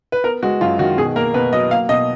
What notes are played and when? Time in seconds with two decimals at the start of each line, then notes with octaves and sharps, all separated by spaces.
0.12 B4
0.24 B3 A#4
0.43 G#3 F#4
0.61 F#2 F4
0.79 D#3 F#4
0.97 B2 G#4
1.16 A#3 A#4
1.34 B2 B4
1.52 F#3 D#5
1.71 A#3 F5
1.89 B2 D#5